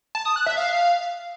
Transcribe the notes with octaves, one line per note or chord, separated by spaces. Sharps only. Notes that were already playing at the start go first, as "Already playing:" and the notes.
A5
D#6
F#6
E5
F5